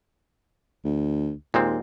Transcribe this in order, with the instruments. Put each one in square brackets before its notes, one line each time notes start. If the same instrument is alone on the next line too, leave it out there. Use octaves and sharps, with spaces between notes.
[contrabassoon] D2
[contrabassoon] D#2 [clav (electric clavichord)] A#2 G#3 C4